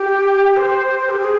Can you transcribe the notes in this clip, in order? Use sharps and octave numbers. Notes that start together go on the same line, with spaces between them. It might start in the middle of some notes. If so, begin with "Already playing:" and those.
Already playing: G4
C5
C5
G4
G#4